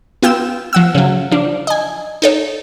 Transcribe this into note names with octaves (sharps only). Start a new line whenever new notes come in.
B3 F4 G5 E6 E7
F3 F#5 E6
C#3 F#3
F3 D4
D#5 G#5
D#4 A4 C#5